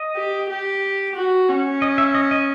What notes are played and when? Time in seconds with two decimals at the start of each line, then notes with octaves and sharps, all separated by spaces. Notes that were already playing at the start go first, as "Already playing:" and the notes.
Already playing: D#5
0.16 G4
0.49 G4
1.16 F#4
1.49 C#4
1.82 D#5
1.98 E5
2.15 D#5
2.31 D#5